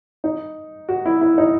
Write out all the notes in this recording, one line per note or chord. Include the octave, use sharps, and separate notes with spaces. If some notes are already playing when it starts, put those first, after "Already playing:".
D#4
F#4
E4
E4
D#4